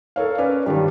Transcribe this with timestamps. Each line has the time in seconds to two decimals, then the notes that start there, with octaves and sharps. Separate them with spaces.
0.16 A4 A#4 C#5 F5
0.38 C#4 B4 D5
0.66 G2 D#3 G3